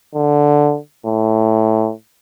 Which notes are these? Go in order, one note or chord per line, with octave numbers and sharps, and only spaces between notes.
D3
A2